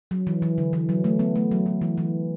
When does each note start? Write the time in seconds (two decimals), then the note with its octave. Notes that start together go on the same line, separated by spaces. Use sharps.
0.11 F#3
0.27 E3
0.42 E3
0.58 D3
0.73 E3
0.89 F#3
1.04 A3
1.19 B3
1.36 A3
1.51 F#3
1.66 F#3
1.81 E3
1.98 E3